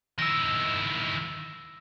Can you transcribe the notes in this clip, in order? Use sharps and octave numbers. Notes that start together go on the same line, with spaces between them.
D#3 E4 E6 A#6